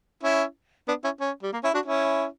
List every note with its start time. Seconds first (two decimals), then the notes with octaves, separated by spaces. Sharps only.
0.23 C#4 E4
0.88 B3 D4
1.04 C#4 E4
1.20 C#4
1.43 G3
1.53 A#3
1.64 C#4 E4
1.74 D4 F#4
1.86 C#4 E4